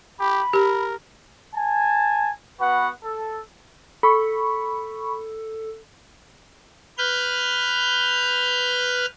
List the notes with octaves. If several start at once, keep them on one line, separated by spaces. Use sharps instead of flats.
G4 B5
G4 A#4
G#5 A5
B3 F#4 B4 F#5
A4
A4 B5 C#6
B4 F6 G6